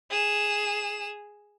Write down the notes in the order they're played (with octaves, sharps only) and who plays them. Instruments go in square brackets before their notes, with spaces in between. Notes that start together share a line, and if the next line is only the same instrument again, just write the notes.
[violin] G#4 E7